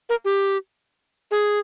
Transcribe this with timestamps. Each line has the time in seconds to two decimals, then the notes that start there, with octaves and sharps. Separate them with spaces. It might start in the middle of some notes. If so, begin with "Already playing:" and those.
0.09 A#4
0.25 G4
1.31 G#4